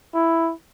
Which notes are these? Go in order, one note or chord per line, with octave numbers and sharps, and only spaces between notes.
E4